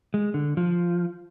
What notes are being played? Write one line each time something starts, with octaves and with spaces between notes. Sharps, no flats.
G#3
D3
F3